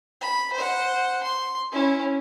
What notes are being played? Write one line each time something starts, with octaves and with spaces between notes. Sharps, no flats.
B5
C5 F#5
C6
C#4 E4